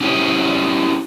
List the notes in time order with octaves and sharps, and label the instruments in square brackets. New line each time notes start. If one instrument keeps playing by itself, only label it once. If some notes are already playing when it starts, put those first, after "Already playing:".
[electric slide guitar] C#4 E4 G4 G#4 C#5